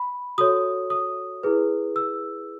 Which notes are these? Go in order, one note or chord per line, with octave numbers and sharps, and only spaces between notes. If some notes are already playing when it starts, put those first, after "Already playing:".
Already playing: B5
F#4 A4 C#5 D#6
D#6
E4 G#4 B4
E6